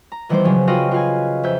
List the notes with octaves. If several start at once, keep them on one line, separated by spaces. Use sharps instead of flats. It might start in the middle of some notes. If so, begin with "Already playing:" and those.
A#5
D#3 E3 G3 B3 C4 C5
C#3 F3 F#3
F4 F#4 B4 D#5 F5 G5
F4 B4 F5 G#5
F2 E5 G6